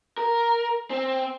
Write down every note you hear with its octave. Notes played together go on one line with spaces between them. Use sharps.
A#4
C4